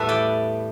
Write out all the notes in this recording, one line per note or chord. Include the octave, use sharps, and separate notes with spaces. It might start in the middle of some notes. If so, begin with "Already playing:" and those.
Already playing: E2 A2 G3 B3 A4 B4 E5
D5 G5